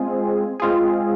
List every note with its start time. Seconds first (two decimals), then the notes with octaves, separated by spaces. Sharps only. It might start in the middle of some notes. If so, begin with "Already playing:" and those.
Already playing: G#3 C4 F4 G#4
0.60 G#3 C4 F4 G#4